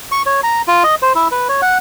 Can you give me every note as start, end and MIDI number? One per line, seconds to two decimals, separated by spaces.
0.12 0.22 85
0.26 0.41 73
0.43 0.62 82
0.68 0.83 65
0.84 0.95 75
1.02 1.13 72
1.15 1.28 64
1.31 1.48 71
1.49 1.61 73
1.62 1.78 78